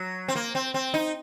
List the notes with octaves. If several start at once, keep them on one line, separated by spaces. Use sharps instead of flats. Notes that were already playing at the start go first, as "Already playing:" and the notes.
Already playing: F#3
C4
A#3
C4
C4
D#4